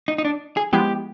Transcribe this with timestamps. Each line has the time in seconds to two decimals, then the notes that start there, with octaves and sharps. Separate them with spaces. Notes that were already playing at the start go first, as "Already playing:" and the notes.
0.08 D#4
0.18 D#4
0.25 D4
0.57 G#4
0.73 F3 G#3 B3 E4 G4